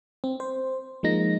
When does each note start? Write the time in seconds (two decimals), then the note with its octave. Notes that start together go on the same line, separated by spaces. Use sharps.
0.24 C4
0.40 C5
1.03 F3 G#3 A#3 D#4 A#6